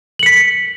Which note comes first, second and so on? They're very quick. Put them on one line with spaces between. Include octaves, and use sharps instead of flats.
F#7 C#7 B6